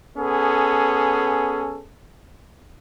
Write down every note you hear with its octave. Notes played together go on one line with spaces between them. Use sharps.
B3 C#4 G#4 A4